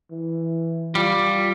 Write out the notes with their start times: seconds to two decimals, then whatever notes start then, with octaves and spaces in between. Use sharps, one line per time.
0.11 E3
0.95 G3 F4